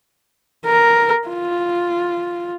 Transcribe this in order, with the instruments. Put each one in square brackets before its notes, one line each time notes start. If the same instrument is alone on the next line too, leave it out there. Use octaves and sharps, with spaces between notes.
[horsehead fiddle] A#4
F4